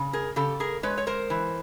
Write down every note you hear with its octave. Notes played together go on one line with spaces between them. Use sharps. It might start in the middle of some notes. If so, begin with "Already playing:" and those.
Already playing: C#3
G#4 A#4
C#3 G4 A4
G#4 A#4
G#3 B4 C#5
C#5
A#4 C5
E3